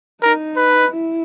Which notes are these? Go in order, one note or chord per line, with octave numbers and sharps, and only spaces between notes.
D#4 A#4
B4
E4